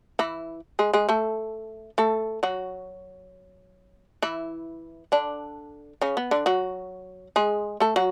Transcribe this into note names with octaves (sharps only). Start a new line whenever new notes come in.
E3 E4
G#3 G#4
G#3 G#4
A3 A4
A3 A4
F#3 F#4
E3 E4
D3 D4
C#3 C#4
B3
D3 D4
F#3 F#4
G#3 G#4
A3 A4
F#3 F#4